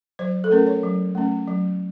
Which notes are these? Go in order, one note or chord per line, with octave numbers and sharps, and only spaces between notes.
F#3 C5
A4
A3 C#4 A#4
C#5
F#3
A3 C#4
F#3